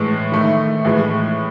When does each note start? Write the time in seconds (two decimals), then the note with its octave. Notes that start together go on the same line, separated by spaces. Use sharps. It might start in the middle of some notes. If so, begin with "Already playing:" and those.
Already playing: A2 E3 G#3
0.32 D#3 A3
0.85 A2 E3 G#3